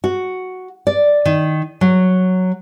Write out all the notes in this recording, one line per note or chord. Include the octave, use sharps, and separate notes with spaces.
F#4
D5
D#3
F#3